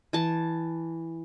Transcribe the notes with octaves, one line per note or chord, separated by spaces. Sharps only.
E3 A5